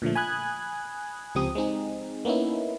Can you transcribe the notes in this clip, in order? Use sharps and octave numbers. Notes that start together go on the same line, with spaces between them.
A#2 D3 F3 A3
G#5 B5 D#6 F#6 G#6
C#2 F3 C4 G4 D#6
G#3 C4 D#4 G#4
A#3 B3 C#4 D#4 E4